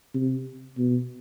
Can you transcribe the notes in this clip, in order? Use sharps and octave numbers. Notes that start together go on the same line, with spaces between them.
C3
B2